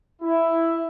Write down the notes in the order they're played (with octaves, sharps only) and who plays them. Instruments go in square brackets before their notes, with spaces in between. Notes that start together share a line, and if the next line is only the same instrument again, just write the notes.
[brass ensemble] E4